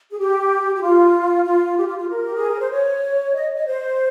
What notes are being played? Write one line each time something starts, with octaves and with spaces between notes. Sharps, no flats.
G#4
G4
G4
F4
F4
G4
F4
F4
A#4
G4
G#4
A#4
C5
C#5
D#5
D#5
C5